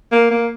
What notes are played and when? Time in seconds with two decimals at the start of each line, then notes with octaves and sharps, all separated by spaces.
0.12 A#3
0.31 A#3